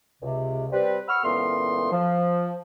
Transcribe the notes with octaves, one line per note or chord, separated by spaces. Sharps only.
C#2 C3
G3 C4 B4
F#5 B5 C#6 E6 F6
C#2 A#2 E3 A3 B3 C6
F3